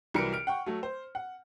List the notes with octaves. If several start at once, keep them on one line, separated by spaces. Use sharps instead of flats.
C2 E3 F#3 A#4 C#7 D7
F6 D7
F#5 G5 C#6
F#3 A3
C5
F#5